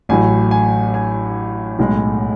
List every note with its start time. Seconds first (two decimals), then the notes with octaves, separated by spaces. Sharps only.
0.09 A1 A2 F#3 G#5
0.51 G#5
0.94 G#5
1.79 B1 A2 G#3